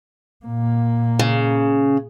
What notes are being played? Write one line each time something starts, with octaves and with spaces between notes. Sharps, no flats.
A#2 A#3
C#3